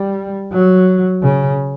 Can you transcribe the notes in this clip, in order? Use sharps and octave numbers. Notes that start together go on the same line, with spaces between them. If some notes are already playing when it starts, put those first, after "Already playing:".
Already playing: G3
F#3
C#3